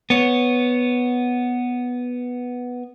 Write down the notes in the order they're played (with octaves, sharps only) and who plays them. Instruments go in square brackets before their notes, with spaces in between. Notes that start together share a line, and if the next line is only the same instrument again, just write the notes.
[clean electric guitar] B3 C#5